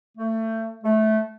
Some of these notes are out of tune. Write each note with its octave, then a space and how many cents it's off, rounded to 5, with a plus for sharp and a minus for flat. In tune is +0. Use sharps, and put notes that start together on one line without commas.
A3 +25
A3 -15